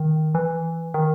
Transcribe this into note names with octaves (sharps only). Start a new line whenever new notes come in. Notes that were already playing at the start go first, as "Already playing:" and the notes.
Already playing: D#3
E3
D#3